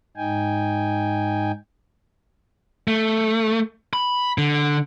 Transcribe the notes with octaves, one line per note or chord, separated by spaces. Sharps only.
G#2 D#4 G5 G#5
A3
B5
D3